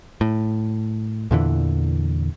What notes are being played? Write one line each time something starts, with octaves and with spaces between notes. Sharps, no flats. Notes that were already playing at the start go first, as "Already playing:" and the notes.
A2
E2 A#2 D3 E3